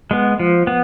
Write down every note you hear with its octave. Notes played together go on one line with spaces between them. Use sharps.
G#3 B3
F3
B3